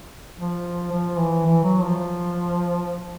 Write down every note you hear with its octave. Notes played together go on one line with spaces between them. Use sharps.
F3
F3
E3
E3
F#3
F3